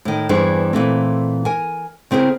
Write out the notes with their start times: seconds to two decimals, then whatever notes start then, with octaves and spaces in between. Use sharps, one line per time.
0.05 A2 D#3
0.29 E2 G2 E3 D4 G#4 C5
0.73 A#2 E3 A3 C4
1.45 A#4 G#5
2.11 C#3 C4 E4 G#4 A#4